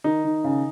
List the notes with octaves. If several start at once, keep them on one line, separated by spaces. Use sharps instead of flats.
D#3 D#4
D#3
C#3